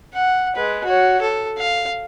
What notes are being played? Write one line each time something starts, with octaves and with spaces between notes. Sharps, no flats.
F#5
G#3 B4
F#4 C#5
A4
F5